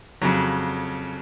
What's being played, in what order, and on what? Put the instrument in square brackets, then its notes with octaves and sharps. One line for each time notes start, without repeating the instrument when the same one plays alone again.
[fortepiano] F2 C#3 F#3